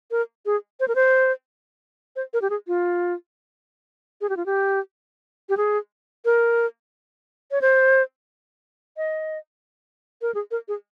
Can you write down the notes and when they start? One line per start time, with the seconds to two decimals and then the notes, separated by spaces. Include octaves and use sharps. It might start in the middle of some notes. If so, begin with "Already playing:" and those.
0.11 A#4
0.46 G#4
0.80 C5
0.88 A#4
0.95 C5
2.16 C5
2.33 A#4
2.42 G4
2.50 G#4
2.67 F4
4.21 G#4
4.29 G4
4.37 F4
4.46 G4
5.49 G4
5.57 G#4
6.25 A#4
7.51 C#5
7.62 C5
8.97 D#5
10.22 A#4
10.34 G#4
10.51 A#4
10.68 G#4